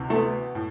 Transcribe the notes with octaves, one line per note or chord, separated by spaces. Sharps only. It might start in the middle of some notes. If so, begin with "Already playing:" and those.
Already playing: D2 C3 E3
A3
B3
A2